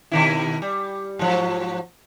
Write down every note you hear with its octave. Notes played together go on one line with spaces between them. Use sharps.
B2 D#3 E4
G3
G#2 F3 F#3